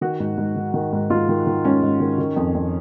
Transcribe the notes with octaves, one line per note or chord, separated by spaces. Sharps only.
D#3 F#4
G#2
G#2
D#3
D#3
G#2
G#2 F4
D#3
D#3
G#2 C#4
G#2
D#3
D#3
F2
F2